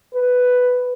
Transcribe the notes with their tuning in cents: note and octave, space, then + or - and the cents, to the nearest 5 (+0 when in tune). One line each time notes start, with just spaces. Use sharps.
B4 +5